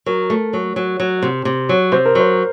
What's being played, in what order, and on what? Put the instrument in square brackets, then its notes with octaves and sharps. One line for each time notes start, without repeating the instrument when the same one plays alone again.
[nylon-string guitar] F#3 [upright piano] A#4
[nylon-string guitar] A3
F#3
F#3
F#3
C3
C3
F#3
[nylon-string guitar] C3 [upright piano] C5
[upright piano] A#4
[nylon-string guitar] F#3 [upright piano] C5